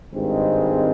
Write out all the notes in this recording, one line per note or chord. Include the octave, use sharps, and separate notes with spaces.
G#1 G2 D#3 G#3 C4